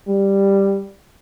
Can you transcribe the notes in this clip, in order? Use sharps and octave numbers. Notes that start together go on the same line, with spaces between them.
G3